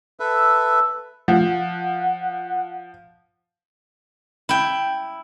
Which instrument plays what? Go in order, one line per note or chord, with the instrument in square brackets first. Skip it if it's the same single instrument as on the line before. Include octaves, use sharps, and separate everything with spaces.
[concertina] A4 B4 E5
[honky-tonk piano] F3 [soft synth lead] F#5
[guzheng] E4 G5